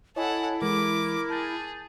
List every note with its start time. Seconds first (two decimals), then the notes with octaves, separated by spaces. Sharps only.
0.16 E4 A4 C#5 D#5 F#5 G#5
0.62 E3 G#3 A#4 D6
1.30 G#4 A5 G6 A6